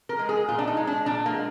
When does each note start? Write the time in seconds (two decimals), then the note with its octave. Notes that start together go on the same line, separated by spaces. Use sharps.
0.09 A#4
0.19 G#3
0.29 G#4
0.48 A#2 F4
0.59 D4
0.67 D#4
0.77 G#3
0.87 D4
1.06 A#2 D4
1.26 A#3
1.34 G#3